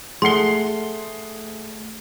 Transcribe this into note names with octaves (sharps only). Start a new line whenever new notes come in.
A3 G#4 F#5 C6 C7 G7